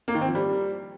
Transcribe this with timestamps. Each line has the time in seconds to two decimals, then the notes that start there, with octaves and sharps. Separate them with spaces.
0.08 A#3
0.15 D#3
0.21 C4
0.28 F3
0.35 G3